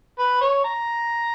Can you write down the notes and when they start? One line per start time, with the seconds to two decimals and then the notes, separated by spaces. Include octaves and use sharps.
0.19 B4
0.41 C#5
0.64 A#5